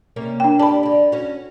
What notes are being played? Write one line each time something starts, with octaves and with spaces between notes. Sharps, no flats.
C3 A#3 C#4
D4 G5
G4 D5 A5 B5
D3 D5
C#4 F#4